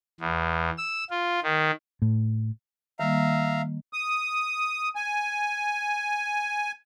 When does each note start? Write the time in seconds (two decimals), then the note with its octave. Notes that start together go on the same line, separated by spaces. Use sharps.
0.20 E2
0.77 E6
1.10 F4
1.43 D#3
2.02 A2
3.00 D#3 G3 A#3 E5 F5 A#5
3.93 D#6
4.95 G#5